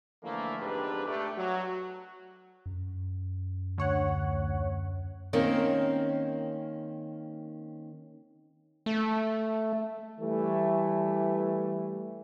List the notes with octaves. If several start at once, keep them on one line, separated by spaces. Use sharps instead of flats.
D3 E3 F3 A3 A#3
F2 G#2 B2 D4 G4 B4
A3 D4 G4
F#3
F#2
D2 C#5 F#5
D#3 A#3 C4 C#4
A3
E3 G3 A3